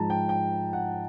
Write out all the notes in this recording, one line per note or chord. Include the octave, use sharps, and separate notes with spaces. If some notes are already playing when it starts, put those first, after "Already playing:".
Already playing: G#2 F3 G#3 A5 A#5
G5
G5
F#5